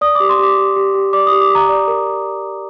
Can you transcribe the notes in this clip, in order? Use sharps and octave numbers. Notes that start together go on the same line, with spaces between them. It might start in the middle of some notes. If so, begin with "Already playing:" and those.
D5 D#6
G4 D6
C6
G4 D6
G4
G4
G4
D5 D6
D#6
G4
D6
G4 A#5
D5
A#4